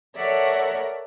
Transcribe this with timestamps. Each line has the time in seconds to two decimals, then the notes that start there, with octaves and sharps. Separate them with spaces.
0.15 A4 A#4 C#5 D5 E5 F#5